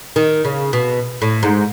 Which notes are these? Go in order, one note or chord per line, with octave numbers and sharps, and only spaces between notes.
D#3
C#3
B2
A2
G#2